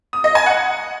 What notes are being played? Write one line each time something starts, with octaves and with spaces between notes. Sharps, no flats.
D#6
D#5
G#5
F#5